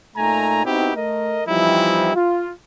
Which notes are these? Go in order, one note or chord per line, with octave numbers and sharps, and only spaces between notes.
A#2 A3 D#4 G#5 A#5
B3 C4 D#4 E4 F#4 G4
A3 A#4 D#5
E3 F3 G3 C4 D#4 E4
F4